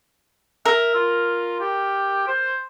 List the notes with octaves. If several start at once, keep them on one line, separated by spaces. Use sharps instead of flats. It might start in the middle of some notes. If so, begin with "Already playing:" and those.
A#4 E5
F4
G4
C5